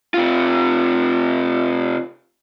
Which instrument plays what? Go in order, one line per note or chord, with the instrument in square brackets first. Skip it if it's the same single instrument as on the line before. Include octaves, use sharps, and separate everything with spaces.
[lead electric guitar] C3 F4